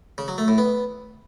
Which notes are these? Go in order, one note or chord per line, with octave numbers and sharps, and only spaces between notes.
C#3
F#3
A3
A2
B3